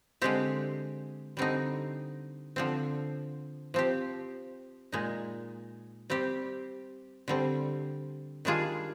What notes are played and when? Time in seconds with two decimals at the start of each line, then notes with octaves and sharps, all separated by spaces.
0.22 D3 G#3 C4 G4
1.37 D3 G3 C4 D#4
2.56 D3 F3 C4
3.74 F3 C4 G4
4.92 A#2 G#3 D#4
6.10 G3 C4 G4
7.28 D3 G3 C4
8.45 D#3 G3 D4 F4 G#4